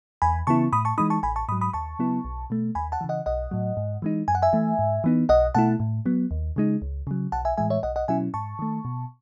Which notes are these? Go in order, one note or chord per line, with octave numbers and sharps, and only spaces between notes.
E2 G#5 B5
C#3 E3 B3 E4 A5 C#6
A2 B5 D#6
A5 C#6
E3 G#3 D#4 B5 D#6
A5 C#6
A1 G#5 B5
A5 C#6
G#2 F#3 B5 D#6
B5 D#6
D#2 A5 C#6
C#3 F#3 B3 E4
B1
B2 A3
D#2 G#5 B5
F#5 A5
C#3 E3
D#5 F#5
B1 D#5 F#5
A2 F#3
G#2
E3 G#3 D#4
F#2 G#5
F#5
E5 G#5
E3 A3
G#2
E3 B3 D#4
B1 D#5 F#5
B2 A3 E4 F#5 A5
A2
F#3 B3
D#2
C#3 G#3 D#4
C#2
C#3 F#3
B1 F#5 A5
E5 G#5
A2 E3 G#3 E5 G#5
C#5 E5
B1 D#5 F#5
D#5 F#5
B2 F#3 C#4 E4 E5 G#5
G#2 A5 C#6
D#3 A3
B2